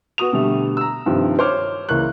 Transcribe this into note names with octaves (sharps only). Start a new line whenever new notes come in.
B3 F#4 D#6 F7
B2 D3 G3 A3
A#5 E6
G2 C3 D#3 F3
C5 C#5 D6 F6
C#2 E3 A#3 C#6 F#6